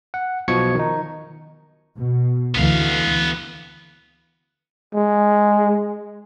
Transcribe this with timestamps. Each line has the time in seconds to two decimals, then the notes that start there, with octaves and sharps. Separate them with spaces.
0.14 F#5
0.48 B1 B2 F3 C#6 G#6 C#7
0.75 D#3 D#4
1.95 B2
2.55 D2 E3 B3 F5
4.95 G#3